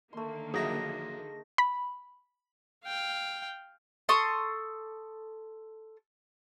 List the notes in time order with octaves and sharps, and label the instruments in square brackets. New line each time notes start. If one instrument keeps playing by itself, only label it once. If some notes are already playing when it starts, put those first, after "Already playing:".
[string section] D3 D#3 A#3 [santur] A3 C6
[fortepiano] A#1 F#3 E5 [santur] D#4 [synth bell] G#4 A#6
[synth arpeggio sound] B5
[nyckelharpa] F5 G5
[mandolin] A4 C6 C#6 D#6